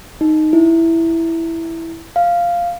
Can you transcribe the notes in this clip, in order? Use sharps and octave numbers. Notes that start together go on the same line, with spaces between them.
D#4
E4
F5